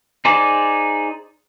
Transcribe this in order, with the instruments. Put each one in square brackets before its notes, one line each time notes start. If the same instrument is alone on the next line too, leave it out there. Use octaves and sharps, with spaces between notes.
[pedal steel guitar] D#4 G#4 C5 D5